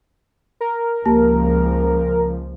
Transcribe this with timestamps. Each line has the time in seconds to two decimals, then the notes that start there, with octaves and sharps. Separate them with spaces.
0.61 A#4
1.06 C#2 F3 A#3 G4 A5